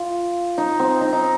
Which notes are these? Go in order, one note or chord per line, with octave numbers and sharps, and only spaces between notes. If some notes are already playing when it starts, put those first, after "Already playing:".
Already playing: F4
D#4
C4
D#4
D#4